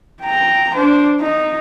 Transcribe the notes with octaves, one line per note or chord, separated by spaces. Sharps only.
G5 A#5
D4 C5
D#4